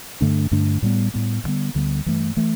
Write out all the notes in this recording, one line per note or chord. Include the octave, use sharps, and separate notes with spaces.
G2 D3 A3 D4
G2 D3 A3 D4
A2 G3 B3
A2 G3 B3
D2 D3 G3 B3
D2 D3 G3 B3
G2 E3 A3
E3 A3